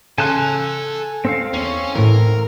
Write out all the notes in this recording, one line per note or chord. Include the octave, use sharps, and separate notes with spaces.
C#3 A4 G#5 A5 C6 F#6
C4 A4 F5
E2 C#4 C#5
A2 E3 A#4